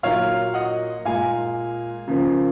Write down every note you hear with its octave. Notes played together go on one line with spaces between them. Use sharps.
A#2 F#3 A#3 C#5 F5
D#5 F#5
A#2 G#3 F5 G#5
C#3 F3 A#3